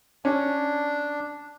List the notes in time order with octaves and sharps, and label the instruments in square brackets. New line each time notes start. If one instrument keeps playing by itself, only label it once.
[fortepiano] C#4 [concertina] D4